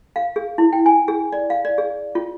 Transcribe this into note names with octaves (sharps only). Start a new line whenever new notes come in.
F5
G#4
E4
G5
G#5
G#4
D5
F5
D5
G#4
F4